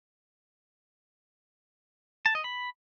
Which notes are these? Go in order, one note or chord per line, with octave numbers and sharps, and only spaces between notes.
A5
D#5
B5